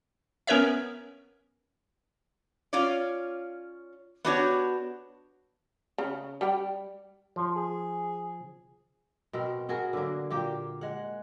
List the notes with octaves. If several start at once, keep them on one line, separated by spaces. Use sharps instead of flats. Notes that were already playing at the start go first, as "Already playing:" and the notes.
B3 C#4 A#4 B4 C#5 E5
C#4 F4 C#5 D5
B3 D4 F#4 G4 C5 C#5
C#3
G3 G4 G5
F3
G#4
B2 C4 A#4
B3 F#4 G#4 A#4
D3 F#3 A#3
A#2 A#3 G4
G#3 F#5